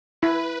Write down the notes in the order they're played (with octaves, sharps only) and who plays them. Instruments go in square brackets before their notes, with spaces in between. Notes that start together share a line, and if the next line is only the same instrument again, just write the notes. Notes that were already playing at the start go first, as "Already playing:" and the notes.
[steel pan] E4 [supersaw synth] B4